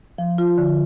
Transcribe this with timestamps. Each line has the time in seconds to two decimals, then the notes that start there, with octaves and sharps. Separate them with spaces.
0.18 F3
0.38 F4
0.58 D3